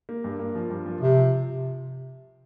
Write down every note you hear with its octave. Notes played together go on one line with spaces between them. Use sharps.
A#3
G2
A#3
F3
G2
F3
C3 F3
F3